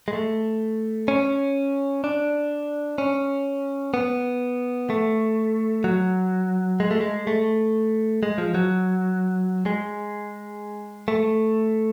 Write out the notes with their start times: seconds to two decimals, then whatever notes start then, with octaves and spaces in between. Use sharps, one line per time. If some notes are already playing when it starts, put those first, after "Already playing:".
0.08 G#3
0.13 A3
1.08 C#4
2.04 D4
2.98 C#4
3.94 B3
4.90 A3
5.84 F#3
6.80 G#3
6.91 A3
7.01 G#3
7.27 A3
8.23 G#3
8.38 F3
8.55 F#3
9.66 G#3
11.08 A3